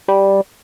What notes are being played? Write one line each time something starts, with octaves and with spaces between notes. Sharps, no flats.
G3